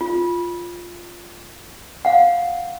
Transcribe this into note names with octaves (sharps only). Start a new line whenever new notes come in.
F4
F5 F#5